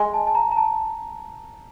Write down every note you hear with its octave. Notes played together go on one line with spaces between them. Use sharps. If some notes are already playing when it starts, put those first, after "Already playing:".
Already playing: G#3 G#5
A5
A5
A#5
A#5
A5